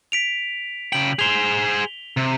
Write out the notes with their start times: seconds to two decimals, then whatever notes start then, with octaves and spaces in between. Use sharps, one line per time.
0.12 B6 D7 F7
0.93 C#3 G5 F#7
1.19 G#4 C5 F7 G7
2.17 C3